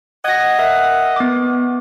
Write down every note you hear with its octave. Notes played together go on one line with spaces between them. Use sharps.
D#5 F#5 G#6 A#6
A#4 E5
B3 D6